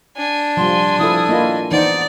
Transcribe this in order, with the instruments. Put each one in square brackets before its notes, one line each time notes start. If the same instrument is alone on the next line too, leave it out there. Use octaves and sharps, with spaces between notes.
[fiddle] D4 G#5
[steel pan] F3 G3 [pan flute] C6
[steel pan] F3 E4 A4 [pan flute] D#6
[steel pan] A#3 E4 F4 [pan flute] D#5
[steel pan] E3 D#4 C5 [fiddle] D5 [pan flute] F#5